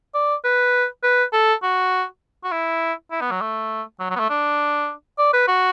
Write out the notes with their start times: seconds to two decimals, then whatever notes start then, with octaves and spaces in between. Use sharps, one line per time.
0.14 D5
0.44 B4
1.03 B4
1.33 A4
1.63 F#4
2.44 F#4
2.52 E4
3.11 E4
3.21 B3
3.31 F#3
3.41 A3
4.00 F#3
4.10 F#3
4.16 B3
4.20 A3
4.30 D4
5.19 D5
5.34 B4
5.48 F#4